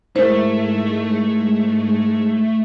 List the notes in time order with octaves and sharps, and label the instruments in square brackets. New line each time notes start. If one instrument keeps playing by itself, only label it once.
[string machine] G#2 G#3 [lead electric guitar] A3 [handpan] E4 A#4 [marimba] C5